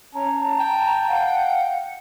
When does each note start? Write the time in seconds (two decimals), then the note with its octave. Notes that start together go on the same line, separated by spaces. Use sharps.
0.15 C#4 A5 A#5
0.60 G5
1.08 F5 F#5